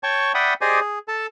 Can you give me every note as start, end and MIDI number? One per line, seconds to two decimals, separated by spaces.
0.03 0.32 73
0.03 0.32 79
0.03 0.32 81
0.03 0.32 85
0.35 0.54 74
0.35 0.54 76
0.35 0.54 78
0.35 0.54 79
0.35 0.54 83
0.35 0.54 87
0.61 0.80 67
0.61 0.80 68
0.61 0.80 72
0.61 0.80 74
0.61 0.80 75
0.61 0.80 80
0.81 0.99 68
1.08 1.26 69
1.08 1.26 81